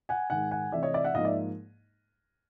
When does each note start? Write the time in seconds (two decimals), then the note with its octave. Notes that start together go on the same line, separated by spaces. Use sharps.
0.09 F#5 G#5
0.30 G#2 D#3 G#3 F#5 G#5
0.51 F#5 G#5
0.72 C3 E3 A3 D5 E5
0.83 C#5 D#5
0.94 D5 E5
1.05 E5 F#5
1.14 G#2 F3 A#3 D#4 D#5 F5
1.25 D5 E5